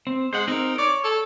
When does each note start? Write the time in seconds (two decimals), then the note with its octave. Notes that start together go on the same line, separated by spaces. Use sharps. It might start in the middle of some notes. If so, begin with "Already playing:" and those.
0.07 C4
0.33 G#3 C5 F#5
0.48 C4 D#4 A#4
0.78 C#5 D5
1.04 A4